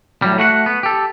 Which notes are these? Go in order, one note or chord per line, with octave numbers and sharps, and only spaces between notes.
A2 F#3 G3
A3 F#4 F#5
B3
G4 A4